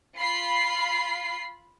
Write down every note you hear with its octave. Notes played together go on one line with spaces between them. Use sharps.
F4 B5 C7